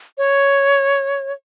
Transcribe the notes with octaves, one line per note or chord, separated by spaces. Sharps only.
C#5